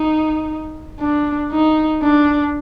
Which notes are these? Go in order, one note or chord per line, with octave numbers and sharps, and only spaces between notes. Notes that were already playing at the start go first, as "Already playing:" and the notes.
Already playing: D#4
D4
D#4
D4